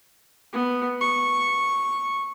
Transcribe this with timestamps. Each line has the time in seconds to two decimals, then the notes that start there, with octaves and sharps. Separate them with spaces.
0.53 B3
1.02 C#6